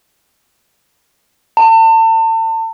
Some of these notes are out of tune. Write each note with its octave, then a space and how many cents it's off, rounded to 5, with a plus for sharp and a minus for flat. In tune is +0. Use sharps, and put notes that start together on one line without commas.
A5 +35